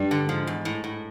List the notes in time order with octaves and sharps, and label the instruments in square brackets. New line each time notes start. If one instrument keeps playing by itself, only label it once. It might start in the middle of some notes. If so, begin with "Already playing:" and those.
Already playing: [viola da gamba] G2
[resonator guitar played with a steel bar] D3
[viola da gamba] G#2 [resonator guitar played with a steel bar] F3
[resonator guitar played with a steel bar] E2
A2
A2